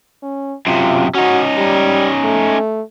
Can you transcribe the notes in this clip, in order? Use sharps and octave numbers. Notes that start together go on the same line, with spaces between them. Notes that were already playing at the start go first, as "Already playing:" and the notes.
C#4
F#2 C3 F4
C#4 D#4 F#4
G3
A3